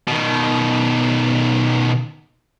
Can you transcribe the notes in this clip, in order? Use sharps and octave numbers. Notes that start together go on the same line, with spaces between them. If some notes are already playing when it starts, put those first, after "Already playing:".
B2 D#3